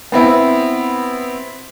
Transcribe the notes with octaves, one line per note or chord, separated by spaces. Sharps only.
B3 C4 E4